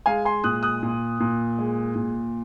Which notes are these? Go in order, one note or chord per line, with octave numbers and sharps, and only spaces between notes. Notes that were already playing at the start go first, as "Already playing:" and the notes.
G#3 F5 G#5
G#5 C6
A#2 D#6 F#6
D#6 F#6
A#2
A#2
G#3
A#2